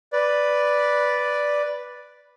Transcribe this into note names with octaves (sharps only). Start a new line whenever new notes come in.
B4 D5